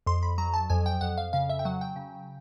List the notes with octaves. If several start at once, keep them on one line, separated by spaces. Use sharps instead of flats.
F2 C6
B5
F#3 A#5
A5
F2 G#5
G5
F2 F#5
F5
C#3 F5
E5
G5
F#3 F#5
G5
C#3